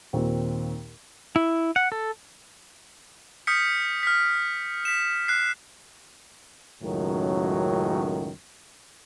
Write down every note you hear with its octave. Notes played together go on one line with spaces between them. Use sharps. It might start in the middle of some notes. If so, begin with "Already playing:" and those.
D#2 A#2 D#3 C4
E4
F#5
A4
D#6 F6 G6 B6 C#7
F6 B6
B6 E7
F#6 C7
C#2 F#2 A2 D#3 F#3